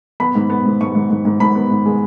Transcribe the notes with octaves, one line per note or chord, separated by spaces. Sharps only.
B3 B5
G#2
B3
G#2
G#2 C#6
G#2
G#2
G#2
G#2 B5
B3
G#2
G#3